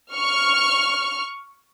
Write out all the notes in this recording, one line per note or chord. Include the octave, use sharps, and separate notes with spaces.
C#6 F6